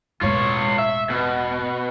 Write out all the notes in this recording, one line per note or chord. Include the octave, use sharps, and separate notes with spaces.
E1 A2 F4 C#5
E5
B2